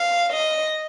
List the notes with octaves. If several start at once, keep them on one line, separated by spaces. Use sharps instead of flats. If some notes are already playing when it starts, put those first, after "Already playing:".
Already playing: F5
D#5